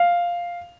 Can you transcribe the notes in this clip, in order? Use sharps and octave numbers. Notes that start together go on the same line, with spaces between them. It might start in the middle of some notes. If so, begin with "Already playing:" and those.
Already playing: F5